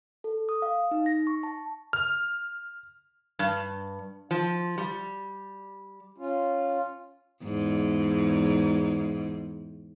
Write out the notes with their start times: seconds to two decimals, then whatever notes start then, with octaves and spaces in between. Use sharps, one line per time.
0.24 A4
0.49 D#6
0.62 F5
0.91 D#4
1.06 A#6
1.27 C#6
1.43 A5
1.93 F6
3.39 G2
4.31 F3
4.78 G3
6.18 C#4 F4
7.44 E2 G#2